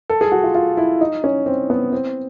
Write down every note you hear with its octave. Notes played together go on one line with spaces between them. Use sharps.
A4
G#4
F#4
F4
F4
E4
D#4
C#4
C4
B3
C4